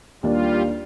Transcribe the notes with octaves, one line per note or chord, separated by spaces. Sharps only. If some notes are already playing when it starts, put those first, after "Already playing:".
D#2 G3 A#3 D4 F4